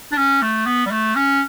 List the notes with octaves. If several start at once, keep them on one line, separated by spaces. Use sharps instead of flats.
D4
C#4
A3
B3
G3
A3
C#4